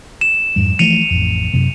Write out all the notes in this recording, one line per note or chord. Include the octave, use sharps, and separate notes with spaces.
E7
F2 G#2 G3
E3 F3 A3 C#7 D#7 F7
A1 F2
F#2 C3